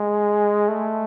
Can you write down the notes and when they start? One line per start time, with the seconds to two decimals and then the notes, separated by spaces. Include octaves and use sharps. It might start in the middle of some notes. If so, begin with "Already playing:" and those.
Already playing: G#3
0.68 A3